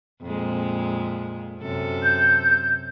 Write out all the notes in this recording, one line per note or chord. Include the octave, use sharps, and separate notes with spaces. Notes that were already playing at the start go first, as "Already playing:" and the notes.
F2 A#2 G#3
F#2 C3 A4
G6